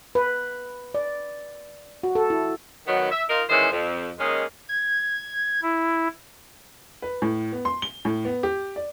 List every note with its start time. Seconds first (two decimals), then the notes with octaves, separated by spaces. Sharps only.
0.15 B4
0.95 D5
2.03 F#4
2.15 A4
2.30 E4
2.87 D#3 F#3 B3
3.11 E5
3.29 D#4 F4 A#4
3.50 D#3 E3 G#3 C#4 G#4 C5
3.72 F2
4.19 D#3 G#3 A#3 C#4 G#4
4.69 G#6
5.62 E4
7.02 B4
7.22 A2
7.52 B3
7.65 C6
7.82 G7
8.05 A2
8.25 B3
8.43 G4
8.76 D5